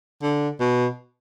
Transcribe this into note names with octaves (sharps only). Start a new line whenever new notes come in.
D3
B2